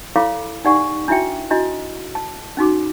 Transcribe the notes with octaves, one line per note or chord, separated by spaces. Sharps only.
E4 A4 C#5 F5 B5 D6
D#4 G4 D5 F#5 G#5 C#6
D4 E4 F#4 E5 G5
D4 E4 F#4 D#5
A5
C#4 D#4 F#4 D6